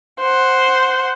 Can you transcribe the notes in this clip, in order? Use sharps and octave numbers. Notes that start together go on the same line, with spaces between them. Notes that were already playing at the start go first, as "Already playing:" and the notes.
C5 F#5